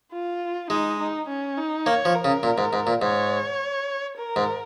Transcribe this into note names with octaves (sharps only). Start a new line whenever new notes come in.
F4
G#3 D#4
D#4
C#4
D#4
A#3 C#5
F3
A#4
C#3
A#2
G#2
G#2
A#2
G#2 C#5
A#4
G#2